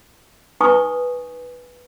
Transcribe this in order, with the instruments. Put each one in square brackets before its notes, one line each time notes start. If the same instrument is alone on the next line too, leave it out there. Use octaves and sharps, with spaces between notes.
[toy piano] D#4 B4 G#5 C#6 D#6